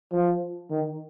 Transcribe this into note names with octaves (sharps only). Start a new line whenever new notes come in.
F3
D#3